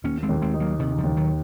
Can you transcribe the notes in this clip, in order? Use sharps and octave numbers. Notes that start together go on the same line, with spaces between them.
D#2 A#3 C#4
G#3 C4
D#2
G#3 C4
D#4
F#3 A#3
C3 D#3 D#4
C#3 F3
D#2
D#3 F#3